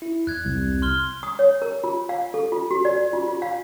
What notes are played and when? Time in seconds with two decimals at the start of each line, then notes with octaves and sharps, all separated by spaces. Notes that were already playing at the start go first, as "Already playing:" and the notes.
0.02 E4
0.27 E2 F#6 G#6
0.45 C2
0.82 C6 F6 G7
1.23 D#6
1.39 C#5
1.62 A#4
1.84 F4
2.09 F5
2.34 A4
2.52 F4
2.71 F#4
2.85 D5
3.13 F4
3.28 F4
3.42 F5